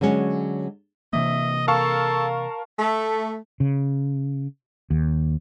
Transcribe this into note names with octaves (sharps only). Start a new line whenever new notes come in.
D3 F#3 G#3 C#4
C3 E3 A#3 D#5 E5
A4 A#4 F5 A5 C#6
A3
C#3
D#2